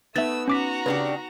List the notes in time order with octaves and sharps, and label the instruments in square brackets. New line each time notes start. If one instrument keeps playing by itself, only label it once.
[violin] A3 E6 [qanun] B3 D#4 C#5 [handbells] E5 A6
[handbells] C#4 D6 B6 [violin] F#4 A#5
[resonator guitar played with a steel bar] C#3 D4 G4 [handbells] B4